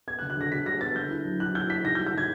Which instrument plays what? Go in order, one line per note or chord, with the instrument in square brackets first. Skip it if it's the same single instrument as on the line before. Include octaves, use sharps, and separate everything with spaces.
[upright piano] B3 G#6
F#6
D3
F#6
D3 A#6
D3 B6
G3 A#6
B3 A6
D3 G6
E4
F#3
E4 F#6
E4 G6
E4 B6
D#3 A#6
G6
G3
G6
D#3 G#6